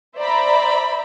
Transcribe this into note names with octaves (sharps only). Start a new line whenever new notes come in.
C5 D5 E5 A#5 B5